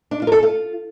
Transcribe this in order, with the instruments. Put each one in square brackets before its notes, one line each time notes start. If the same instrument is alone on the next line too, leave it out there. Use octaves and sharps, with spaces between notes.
[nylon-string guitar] D4
F4
A#4
A4
F4